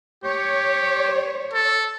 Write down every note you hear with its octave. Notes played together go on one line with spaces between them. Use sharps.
G4 C#5
A4